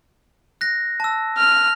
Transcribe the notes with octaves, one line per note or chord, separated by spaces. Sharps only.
F#6 A#6
A5 E6
F6